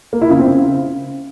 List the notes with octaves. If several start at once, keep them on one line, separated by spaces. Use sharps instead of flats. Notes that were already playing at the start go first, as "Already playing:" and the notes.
A#3
E4
C#3
C4
C#3